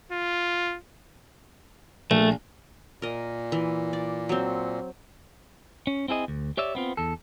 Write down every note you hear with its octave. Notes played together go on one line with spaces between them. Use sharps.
F4
A#1 A3
A#2 A#4 D#5
E3
D5
F#3 C4
C#4
C4 E4 G#4 D#5
D2
G4 C#5 D5 E5
B3 C4 F4
E2 A4